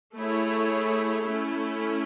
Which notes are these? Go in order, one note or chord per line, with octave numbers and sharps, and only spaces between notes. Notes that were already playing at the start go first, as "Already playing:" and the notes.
A3 E4 G#4 C#5
A3 C#4 E4